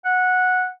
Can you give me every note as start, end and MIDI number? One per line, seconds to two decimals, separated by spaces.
0.05 0.67 78